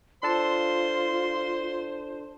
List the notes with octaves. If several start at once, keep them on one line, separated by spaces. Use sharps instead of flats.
D4 F4 A4 C5 A5 C6